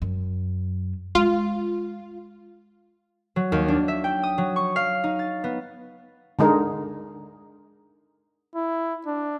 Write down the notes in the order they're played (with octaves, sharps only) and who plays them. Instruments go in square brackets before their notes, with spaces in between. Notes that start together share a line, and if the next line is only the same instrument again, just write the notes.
[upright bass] F#2
[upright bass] G#3 [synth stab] F4
[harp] F#3
D#2
D4
E5
G5
D#6
F#3
C#6
F5
D#4
A6
B3
[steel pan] D3 G#3 D#4 A#4
[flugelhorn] E4
D4